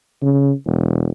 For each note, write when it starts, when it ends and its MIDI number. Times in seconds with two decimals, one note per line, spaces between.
0.22 0.51 49
0.66 1.09 28